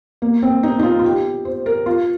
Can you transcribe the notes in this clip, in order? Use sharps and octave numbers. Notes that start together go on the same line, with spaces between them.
A#3
C4
D#4
D#4
F4
F4
G4
C5
A#4
F4